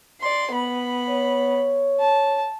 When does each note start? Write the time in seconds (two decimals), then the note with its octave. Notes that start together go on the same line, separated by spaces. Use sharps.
0.21 D5 C6
0.51 B3 B5
1.10 C#5
2.00 A5